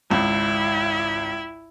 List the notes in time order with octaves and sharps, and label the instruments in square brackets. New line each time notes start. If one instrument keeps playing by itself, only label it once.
[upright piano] G#1 C#2 [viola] E4